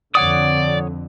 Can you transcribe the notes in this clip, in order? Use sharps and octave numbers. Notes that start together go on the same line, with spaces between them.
F2 D3 C#5 D5 F#5 D#6